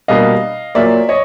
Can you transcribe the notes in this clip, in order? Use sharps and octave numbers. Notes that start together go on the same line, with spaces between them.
B2 G3 A#3 D4 D#5 F5
A#2 F#3 A#3 D5 E5
C#5 D#5